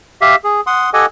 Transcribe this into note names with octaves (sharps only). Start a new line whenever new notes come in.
G4 E5 F5
G#4
F#5 C6 D#6
G4 A4 D#5 F#5 G#5